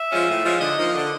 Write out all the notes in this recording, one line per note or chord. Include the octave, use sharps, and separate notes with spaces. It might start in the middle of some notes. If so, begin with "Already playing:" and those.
Already playing: E5
F3 G#3 C#4 F4
A2
F3 G#3 C#4 F4
D3 D#5
F3 A#3 D#4
D3